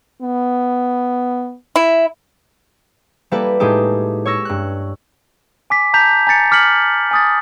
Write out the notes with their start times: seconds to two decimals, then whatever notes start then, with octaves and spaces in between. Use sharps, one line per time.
0.22 B3
1.76 E4
3.31 G3 A#3 E4 A4 B4
3.60 A2 G#3 D#4 G4 A4
4.25 C#5 C#6 E6 A#6
4.45 G2 F#6
5.70 G#5 D6 B6
5.94 A5 A#5 G6 B6 F7
6.27 G#5 A#5 A6 C#7
6.51 D6 F6 B6 C#7 F#7
7.11 G#5 D#6 A6